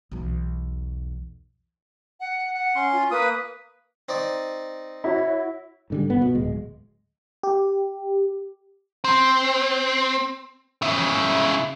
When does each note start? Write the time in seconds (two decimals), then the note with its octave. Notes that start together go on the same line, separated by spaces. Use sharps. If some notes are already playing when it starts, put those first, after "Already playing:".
0.11 B1 E2
2.20 F#5
2.54 F#5
2.75 C#4 C6
2.93 F4
3.11 A#3 B4 D#6
4.09 C4 D#4 D5
5.04 E4 F#4 C#5
5.90 G#2 D3 G3
6.10 G1 B3
6.22 B2
6.35 D1 G#3
7.43 G4
9.04 C4
10.82 C#3 E4